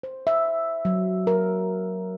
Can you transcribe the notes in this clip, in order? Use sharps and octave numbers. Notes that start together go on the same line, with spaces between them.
C5
E5
F#3
A#4